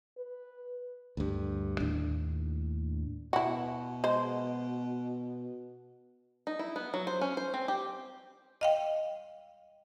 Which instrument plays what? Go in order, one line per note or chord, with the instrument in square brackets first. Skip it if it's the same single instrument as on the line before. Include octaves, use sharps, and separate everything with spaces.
[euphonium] B4
[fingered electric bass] D2 G2
D#2 A2 D4
[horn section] B2 [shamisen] E4 F#4
[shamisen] G#3 C5
[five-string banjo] D#4
E4
B3
F#3
C5
C#4
C5
C4
G4
[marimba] D#5 F5 G5